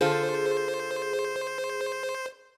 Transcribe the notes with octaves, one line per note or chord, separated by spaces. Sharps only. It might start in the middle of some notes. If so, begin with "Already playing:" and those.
D3 F4 G#4 A4 C5